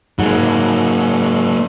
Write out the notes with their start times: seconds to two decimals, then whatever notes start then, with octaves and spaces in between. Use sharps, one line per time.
0.19 G#2 F#3 A#3